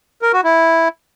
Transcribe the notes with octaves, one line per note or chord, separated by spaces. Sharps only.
A#4
F#4
E4